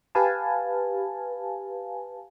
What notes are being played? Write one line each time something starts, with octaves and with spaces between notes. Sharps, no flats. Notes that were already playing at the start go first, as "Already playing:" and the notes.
G4 B4 F5 G#5 A5